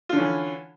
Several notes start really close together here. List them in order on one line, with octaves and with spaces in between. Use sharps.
F4 D3 C#4 E3